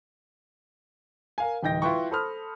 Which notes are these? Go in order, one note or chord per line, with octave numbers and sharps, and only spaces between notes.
A#4 F5 G#5
D1 E3 D#4 G5 G6 A#6
E4 F4 B4 G5 C#6
A4 C5 B5 D#6 F6